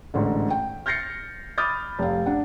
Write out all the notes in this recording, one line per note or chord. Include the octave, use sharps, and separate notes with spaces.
A1 G#2 D3
G5
F6 G6 A6 A#6 C7 C#7
B5 D6 D#6 F6 G6 A6
F1 F5
D4 F#5